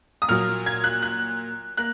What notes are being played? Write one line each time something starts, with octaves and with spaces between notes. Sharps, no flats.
D#6
A#2 F#3 A#3 F6
G#6
F#6
F#6
A#3 F#6